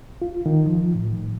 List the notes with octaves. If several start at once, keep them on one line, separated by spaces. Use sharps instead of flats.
F4
D#3
F3
A2